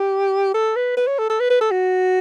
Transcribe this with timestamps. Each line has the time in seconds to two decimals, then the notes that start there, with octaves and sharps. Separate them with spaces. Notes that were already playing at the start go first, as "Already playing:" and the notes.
Already playing: G4
0.54 A4
0.76 B4
0.97 B4
1.07 C#5
1.18 A4
1.29 A4
1.40 B4
1.50 B4
1.61 A4
1.71 F#4